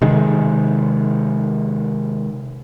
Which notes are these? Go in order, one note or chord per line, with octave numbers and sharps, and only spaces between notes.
C3 D#3 G#3